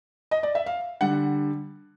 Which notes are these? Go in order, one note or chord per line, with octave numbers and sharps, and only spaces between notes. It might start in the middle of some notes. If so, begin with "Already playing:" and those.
D#5
D5
E5
F5
D3 G3 F#5